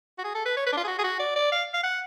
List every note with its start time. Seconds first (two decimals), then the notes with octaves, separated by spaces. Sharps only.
0.18 F#4
0.24 G#4
0.35 A4
0.46 B4
0.57 C#5
0.67 B4
0.72 D4
0.77 F4
0.84 G#4
0.87 F#4
0.99 G#4
1.04 F#4
1.19 D5
1.36 D5
1.52 F5
1.74 F5
1.83 F#5